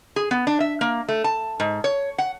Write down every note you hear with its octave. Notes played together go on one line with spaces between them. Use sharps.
G#4
B3
D4
E5
A#3
A3
A5
G#2
C#5
F#5